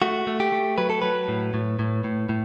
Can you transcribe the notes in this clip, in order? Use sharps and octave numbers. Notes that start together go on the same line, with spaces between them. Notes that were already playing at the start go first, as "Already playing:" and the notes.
A3 F#4
A3
G4
A3
F#3 B4
A4
F#3 B4
A2
A2
A2
A2
A2